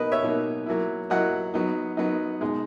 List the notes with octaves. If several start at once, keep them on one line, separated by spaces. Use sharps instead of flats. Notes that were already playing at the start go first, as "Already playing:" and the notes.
Already playing: B2 A#3 D#4 A#4 B4 D#5
C#5 E5
B2 A#3 D#4
F#3 A#3 E4
F#3 A#3 E4 D#5 F#5
F#3 B3 D#4
F#3 B3 D#4
B2 G#3 D#4